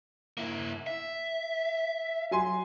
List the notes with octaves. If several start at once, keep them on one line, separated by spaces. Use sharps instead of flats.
A#3 E4
E5
F#3 G#5 C6